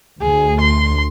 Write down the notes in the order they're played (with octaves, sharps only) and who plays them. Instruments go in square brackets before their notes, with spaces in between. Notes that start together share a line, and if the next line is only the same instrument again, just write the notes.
[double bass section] D2 [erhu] G#4
[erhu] C6